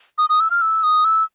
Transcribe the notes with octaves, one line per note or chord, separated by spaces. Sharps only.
D#6
D#6
E6
F6
E6
D#6
E6